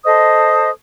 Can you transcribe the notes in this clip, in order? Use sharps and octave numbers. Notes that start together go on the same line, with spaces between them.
A4 C5 D#5 D#6